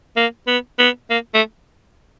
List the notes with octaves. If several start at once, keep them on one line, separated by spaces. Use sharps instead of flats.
A#3
B3
B3
A#3
A3